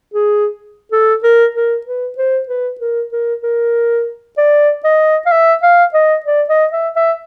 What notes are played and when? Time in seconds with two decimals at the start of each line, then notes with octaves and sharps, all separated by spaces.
0.14 G#4
0.92 A4
1.23 A#4
1.55 A#4
1.87 B4
2.18 C5
2.49 B4
2.81 A#4
3.12 A#4
3.43 A#4
4.37 D5
4.84 D#5
5.26 F5
5.32 E5
5.63 F5
5.94 D#5
6.26 D5
6.49 D#5
6.73 E5
6.96 E5